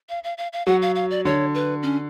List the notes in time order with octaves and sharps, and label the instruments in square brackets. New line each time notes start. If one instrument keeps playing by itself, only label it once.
[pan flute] F5
F5
F5
F5
[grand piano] F#3 [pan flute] F#5
[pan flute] F5
F5
D5
[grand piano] D3 [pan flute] C#5
[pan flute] B4
C#4